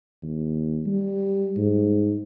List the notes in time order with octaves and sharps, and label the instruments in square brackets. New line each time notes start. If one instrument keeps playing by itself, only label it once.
[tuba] D#2
G3
G#2